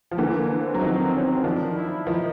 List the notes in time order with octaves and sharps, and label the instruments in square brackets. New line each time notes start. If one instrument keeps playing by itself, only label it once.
[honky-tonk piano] F3
[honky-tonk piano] D3 E3 [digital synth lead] A#3
[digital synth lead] A#3
C4
[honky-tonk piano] F#3
[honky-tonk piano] D#3 F3 [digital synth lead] C4
[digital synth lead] C4
C#4
C4
[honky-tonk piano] D#3 F3 [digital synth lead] D4
[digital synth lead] E4
[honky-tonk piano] D#3 F3 [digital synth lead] D#4